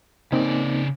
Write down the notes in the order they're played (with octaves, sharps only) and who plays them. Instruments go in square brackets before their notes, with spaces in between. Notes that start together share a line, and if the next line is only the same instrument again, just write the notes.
[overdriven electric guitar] C#3 D5 [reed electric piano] A#3 C4 D#4